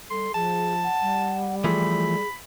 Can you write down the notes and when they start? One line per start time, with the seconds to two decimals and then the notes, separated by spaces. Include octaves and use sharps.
0.10 G3 A4 C6
0.34 F3 G#4 A5
0.84 F#5
1.02 G3
1.64 E3 F3 A3 G#4 B5